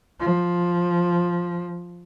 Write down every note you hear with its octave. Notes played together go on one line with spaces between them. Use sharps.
F3